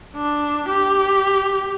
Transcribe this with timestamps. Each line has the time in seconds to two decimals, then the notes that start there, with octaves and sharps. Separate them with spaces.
0.16 D4
0.69 G4